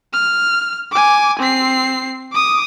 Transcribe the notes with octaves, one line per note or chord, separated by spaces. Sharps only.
F6
G#5 D6
C4 C7
D6 D#6